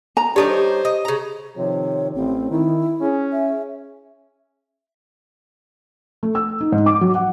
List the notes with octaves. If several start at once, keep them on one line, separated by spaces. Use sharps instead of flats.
A#5
G3 D4 D#4 G4 A4 B4 C#5
C5
D#5
C#3 A#5
C3 D#3 F3 C#5
A1 C4
D#3 E4
C#4 G#4
E5
A3
E6
D#4
G#2
D6
F#3
F#5